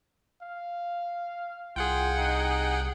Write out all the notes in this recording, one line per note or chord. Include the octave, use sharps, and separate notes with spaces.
F5
C2 F4 G#4 F#5 G5
D#4